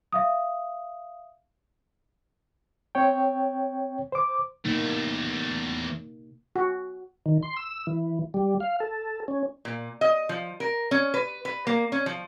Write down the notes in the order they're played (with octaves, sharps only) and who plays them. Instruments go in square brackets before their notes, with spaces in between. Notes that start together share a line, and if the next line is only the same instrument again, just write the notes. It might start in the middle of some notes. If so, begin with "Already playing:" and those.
[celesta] E5 F5 D#6
[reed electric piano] C4 C#5 G5
C5 D6
[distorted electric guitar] E2 A3 [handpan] C3 A#3 D#4
[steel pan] F#4
[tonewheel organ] D#3
C6
E6
E3
G3
F5
A4
C#4
[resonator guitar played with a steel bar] A#2
D#5
F3
A#4
C#4
B4
B4
A#3
C#4
F3